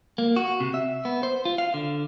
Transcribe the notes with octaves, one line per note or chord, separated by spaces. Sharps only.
A#3
F#4
C3
E5
B3
C5
F4
F5
D3